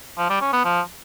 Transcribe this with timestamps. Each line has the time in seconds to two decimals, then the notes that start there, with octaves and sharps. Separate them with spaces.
0.18 F3
0.29 G3
0.41 C#4
0.53 B3
0.64 F3